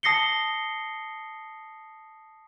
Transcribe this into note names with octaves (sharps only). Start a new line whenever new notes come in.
A5 D#6 A#6 C7 C#7 G7